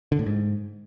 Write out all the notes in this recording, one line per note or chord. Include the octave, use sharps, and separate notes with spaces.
D3
A2
G#2